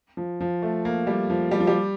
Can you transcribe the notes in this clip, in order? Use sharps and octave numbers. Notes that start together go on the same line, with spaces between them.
F3
F3
A3
A#3
G3
F3
G3
F3
G3